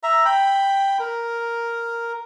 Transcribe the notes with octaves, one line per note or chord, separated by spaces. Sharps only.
E5 A#5
G5 B5
A#4